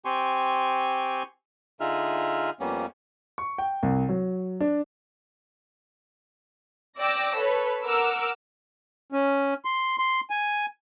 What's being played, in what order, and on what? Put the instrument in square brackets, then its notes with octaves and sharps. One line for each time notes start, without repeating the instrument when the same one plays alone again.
[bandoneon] C4 G4 G#5 C6 C#6
D3 D#4 F4 G#4 E5 F6
F2 G3 A#3 B3 C#4
[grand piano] C#6
G5
C2
F#3
D4
[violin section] D5 G5 D6 E6 A#6
A4 B4 C#5
A#4 F#5 D6 E6 F6
[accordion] C#4
C6
C6
G#5